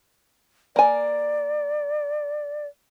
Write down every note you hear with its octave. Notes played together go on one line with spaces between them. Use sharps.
A#3 D5 G#5